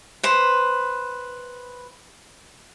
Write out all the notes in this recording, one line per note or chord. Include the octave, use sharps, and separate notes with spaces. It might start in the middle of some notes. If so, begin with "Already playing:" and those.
B4 C5